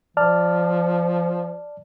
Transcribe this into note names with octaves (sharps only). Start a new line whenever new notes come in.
F3 D5 A5 F6